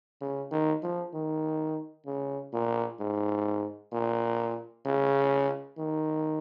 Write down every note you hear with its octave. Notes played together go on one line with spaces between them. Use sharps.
C#3
D#3
F3
D#3
C#3
A#2
G#2
A#2
C#3
D#3